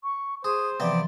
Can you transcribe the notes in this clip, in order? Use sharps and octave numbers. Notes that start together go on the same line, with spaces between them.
C#6
G#4 C5 D#6
C3 E3 F3 B3 D5 G5